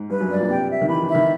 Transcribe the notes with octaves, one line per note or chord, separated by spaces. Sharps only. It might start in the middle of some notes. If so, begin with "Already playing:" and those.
Already playing: G#2
G2 B4
F#2
G2 D5
A#2
C3 G5
E5
D#3
E3 B5
E3
E5
D#3